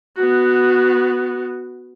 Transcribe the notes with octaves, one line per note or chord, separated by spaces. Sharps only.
B3 F#4